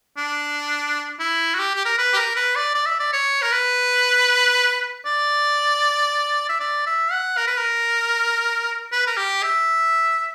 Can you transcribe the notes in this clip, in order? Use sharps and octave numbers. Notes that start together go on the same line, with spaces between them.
D4
E4
F#4
G4
G4
A#4
B4
G4
A#4
B4
D5
D5
E5
D5
C#5
A#4
B4
D5
E5
D5
E5
F#5
A#4
B4
A#4
B4
A#4
G4
E5